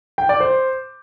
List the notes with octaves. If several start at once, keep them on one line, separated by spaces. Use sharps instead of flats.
G5
D5
C5